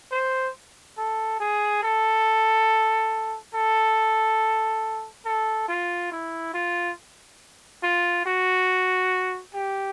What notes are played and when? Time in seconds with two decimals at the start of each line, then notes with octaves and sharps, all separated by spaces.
0.12 C5
0.98 A4
1.40 G#4
1.83 A4
3.54 A4
5.25 A4
5.68 F4
6.12 E4
6.54 F4
7.83 F4
8.26 F#4
9.54 G4